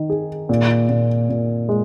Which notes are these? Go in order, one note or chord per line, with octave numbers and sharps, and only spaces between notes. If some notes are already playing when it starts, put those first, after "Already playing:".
Already playing: D#3 D#4
G#4
A#2
A#2
A#2
G#3